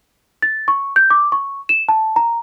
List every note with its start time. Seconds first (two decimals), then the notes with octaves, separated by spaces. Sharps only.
0.42 A6
0.68 C#6
0.96 G6
1.10 D6
1.32 C#6
1.69 E7
1.89 A5
2.16 A#5